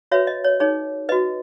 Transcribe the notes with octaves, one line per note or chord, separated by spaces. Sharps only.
F#4 B4 C#5 E5
D#5
C#5
D#4 G#4 C#5
F#4 B4 D#5